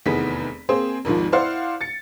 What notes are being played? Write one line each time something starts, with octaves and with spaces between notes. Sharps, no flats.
F1 E2 D#3 B3 G#4 B6
A#3 C4 G#4 C5
G#1 D#2 G#2 F3
E4 C5 D5 F5 F#5
A6 C#7